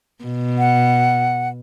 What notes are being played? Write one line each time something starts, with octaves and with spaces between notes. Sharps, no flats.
B2
F#5